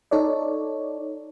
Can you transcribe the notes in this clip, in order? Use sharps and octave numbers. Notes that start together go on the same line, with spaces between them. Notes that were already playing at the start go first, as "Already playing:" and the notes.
D#4 A4 C#5 D5